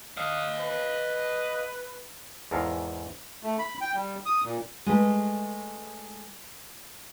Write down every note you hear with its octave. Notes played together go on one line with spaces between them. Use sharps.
D#5 F5
B4
E2 G#2 A4 A#4 F5
A3
B5
G5
G3
D#6
A#2
G#3 A3 B4